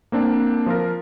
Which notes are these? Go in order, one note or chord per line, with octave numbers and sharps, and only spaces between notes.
A#3 C4 D4
F3 F4 A#4